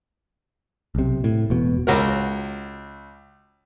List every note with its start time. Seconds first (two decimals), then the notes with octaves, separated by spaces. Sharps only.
0.95 B1 C3
1.24 A2
1.50 E1 B2
1.87 C#2 F#4 A#4